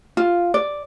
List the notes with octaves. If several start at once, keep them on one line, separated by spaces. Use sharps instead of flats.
F4
D5